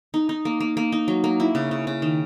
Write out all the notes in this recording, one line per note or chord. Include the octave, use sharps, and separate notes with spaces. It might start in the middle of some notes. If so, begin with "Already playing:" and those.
D#4
D#4
A#3
A#3
A#3
D#4
F#3
A#3
E4
C#3
C#3
C#3
D#3